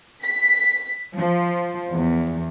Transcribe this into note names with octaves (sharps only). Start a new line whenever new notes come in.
B6
F3
E2